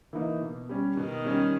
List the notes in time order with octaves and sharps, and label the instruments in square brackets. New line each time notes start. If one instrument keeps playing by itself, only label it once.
[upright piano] E3 A#3 D#4
B2
G3 C#4
[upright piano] B2 [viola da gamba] D#3
[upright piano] G3 C#4